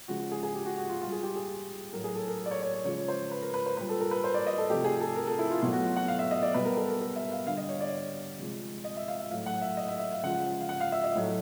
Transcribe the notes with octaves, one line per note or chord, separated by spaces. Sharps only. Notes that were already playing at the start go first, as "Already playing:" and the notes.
C#3 F3 G#3 F#4
G#4
G#4
G4
F#4
F#4
F4
A#2 G3 F4
G#4
G4
G#4
A2 F#3 A3 A#4
G#4
A4
A#4
D5
C#5
C#5
C#5
C#3 F3 G#3 C#5
C5
B4
A#4
B4
C5
A#2 G3 B4
A4
A#4
B4
C5
D5
D#5
A4
C3 F3 A3 G4
G#4
A4
A#4
A4
E4
F4
B2 F#3 A3 F4
F#4
F#5
F5
E5
D#5
D5
B2 G3 B4
A#4
A4
A#4
A#4
E5
F5
D3 G3 F5
D#5
C#5
D5
C3 F3 G#3
D#5
E5
F5
E5
A2 F#3 A3 F5
F#5
E5
D#5
E5
E5
F5
C#3 F3 G#3 F#5
F5
F#5
F5
E5
D#5
A2 F#3 A3